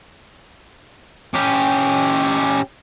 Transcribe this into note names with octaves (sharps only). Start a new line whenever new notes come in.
C#4 G4